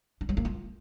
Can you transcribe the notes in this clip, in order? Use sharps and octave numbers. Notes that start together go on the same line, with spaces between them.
D4
G#3
A#3
F4